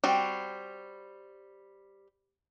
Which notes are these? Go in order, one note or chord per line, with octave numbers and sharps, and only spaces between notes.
G3 C4 F#4